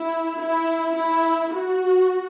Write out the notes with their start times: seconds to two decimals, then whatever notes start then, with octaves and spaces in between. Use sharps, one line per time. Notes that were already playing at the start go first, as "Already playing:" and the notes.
Already playing: E4
0.41 E4
0.97 E4
1.54 F#4